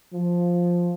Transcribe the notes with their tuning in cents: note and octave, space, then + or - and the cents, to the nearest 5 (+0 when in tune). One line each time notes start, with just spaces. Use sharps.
F3 +5